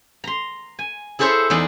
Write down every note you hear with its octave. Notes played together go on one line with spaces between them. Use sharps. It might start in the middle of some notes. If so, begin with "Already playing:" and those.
A#5 C6
G#5
E4 G#4 A4 C5 C#5 E5
E2 D#4 G#4 D5